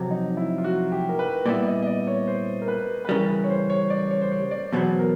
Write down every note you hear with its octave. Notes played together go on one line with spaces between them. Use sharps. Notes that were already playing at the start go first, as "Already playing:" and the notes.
Already playing: F2 C3 F#3
D#4
E4
F4
F#4
G4
A#4
B4
A#2 G3 B3 E4 D5
D#5
D#5
D5
C#5
C5
A#4
B4
B4
C#3 E3 G3 A#4
B4
C#5
C5
C#5
D5
C#5
C5
C#5
D5
E2 B2 F#3 B3 C5
A#4